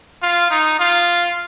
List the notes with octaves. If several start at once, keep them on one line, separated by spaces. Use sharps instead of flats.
F4
D#4
F4